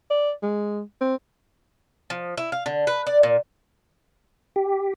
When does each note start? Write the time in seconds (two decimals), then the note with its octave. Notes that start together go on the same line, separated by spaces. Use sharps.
0.11 D5
0.43 G#3
1.01 C4
2.10 F3
2.37 E4
2.52 F5
2.66 D3
2.87 B4
3.07 D5
3.23 A#2
4.56 G4